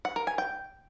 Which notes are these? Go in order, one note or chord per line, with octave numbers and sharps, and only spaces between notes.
F#5
A#4
G#5
G5